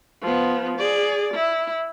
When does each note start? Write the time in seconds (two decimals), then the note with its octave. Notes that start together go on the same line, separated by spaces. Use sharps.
0.22 F3 B3
0.78 G#4 D5
1.34 E4